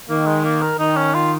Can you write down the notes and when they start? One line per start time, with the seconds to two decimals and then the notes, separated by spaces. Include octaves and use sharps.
0.09 D#3 A#3
0.27 G#3
0.44 A#3
0.62 A#4
0.79 D#3 D#4
0.97 C#4
1.14 F4